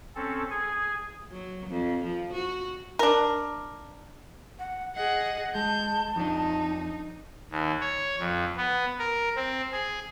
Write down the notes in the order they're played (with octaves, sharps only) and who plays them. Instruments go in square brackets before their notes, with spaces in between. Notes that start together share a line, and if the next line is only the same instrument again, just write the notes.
[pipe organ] C4 C#4 A4
G#4 G#5
[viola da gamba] F#3
F2
F3
F#4
[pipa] D4 A#4
[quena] F#5
[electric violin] G#4 F#5 [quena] D#5
[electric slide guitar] G#3 [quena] A5 [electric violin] G6
[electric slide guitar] F2 D4 [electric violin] D#4
[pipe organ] D#2
C#5
F2
B3
A#4
C4
G#4